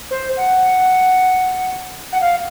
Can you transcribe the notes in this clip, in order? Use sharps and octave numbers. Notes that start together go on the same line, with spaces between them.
C5
F#5
F#5
F5